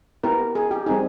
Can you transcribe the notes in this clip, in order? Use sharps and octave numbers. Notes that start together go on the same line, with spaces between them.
B3 E4 G4 A#4
G#4
G4
G3 C4 D#4 G#4